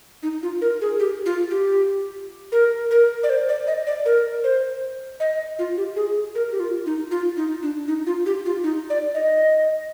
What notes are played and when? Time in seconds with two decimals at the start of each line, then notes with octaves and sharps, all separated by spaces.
0.23 D#4
0.43 F4
0.61 A#4
0.81 G#4
1.00 G4
1.26 F4
1.51 G4
2.52 A#4
2.91 A#4
3.23 D5
3.30 C5
3.49 D5
3.67 D#5
3.87 D5
4.05 A#4
4.44 C5
5.20 D#5
5.59 F4
5.77 G4
5.96 G#4
6.35 A#4
6.52 G4
6.60 F4
6.86 D#4
7.11 F4
7.37 D#4
7.63 D4
7.88 D#4
8.07 F4
8.26 G4
8.46 F4
8.64 D#4
8.90 D5
9.15 D#5